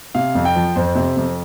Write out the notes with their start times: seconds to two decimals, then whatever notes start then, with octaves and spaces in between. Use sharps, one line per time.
0.14 C3 F5
0.35 F2
0.45 G5
0.55 F3
0.76 F2 C5
0.95 C3
1.17 F2